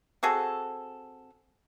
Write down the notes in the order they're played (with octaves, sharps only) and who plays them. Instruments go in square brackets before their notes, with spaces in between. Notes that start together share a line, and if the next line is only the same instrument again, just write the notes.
[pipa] C4 F#4 G#4 A4